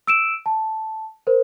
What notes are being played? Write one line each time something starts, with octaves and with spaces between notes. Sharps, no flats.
E6 D7 E7
A5
A#4 C5